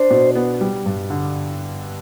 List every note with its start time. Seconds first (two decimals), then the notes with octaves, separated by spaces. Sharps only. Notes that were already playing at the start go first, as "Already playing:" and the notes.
Already playing: D4 C5
0.11 B2
0.35 B3
0.61 G3
0.86 G2
1.10 D3